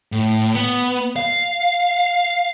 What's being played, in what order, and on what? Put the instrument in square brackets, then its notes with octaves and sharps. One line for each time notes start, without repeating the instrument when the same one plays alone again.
[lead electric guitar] A2
B3
F5